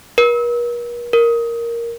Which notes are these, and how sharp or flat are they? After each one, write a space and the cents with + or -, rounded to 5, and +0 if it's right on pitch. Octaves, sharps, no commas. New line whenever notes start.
A#4 +45
A#4 +0